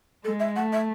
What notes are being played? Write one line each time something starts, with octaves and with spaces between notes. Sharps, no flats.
G#3 A4
E5
A3 F#5
E5